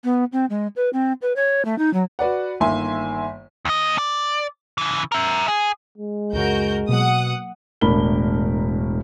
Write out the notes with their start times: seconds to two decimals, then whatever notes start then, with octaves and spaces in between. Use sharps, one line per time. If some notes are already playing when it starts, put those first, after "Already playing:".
0.04 B3
0.33 C4
0.50 G#3
0.76 B4
0.93 C4
1.22 B4
1.36 C#5
1.65 A3
1.78 D#4
1.94 F#3
2.19 F#4 B4 D5 F#5
2.60 G1 D#3 A#3 E5 G#5 C6
3.65 D#2 D#5
3.98 D5
4.78 C#3 E3
5.12 A#4 E5
5.48 G#4
5.98 G#3
6.33 C#2 F#2 C#3 F#4 A#4 G6
6.88 B2 F#3 A#3 F#5 D#6
7.81 E1 A2 D4 A#4 B5 G7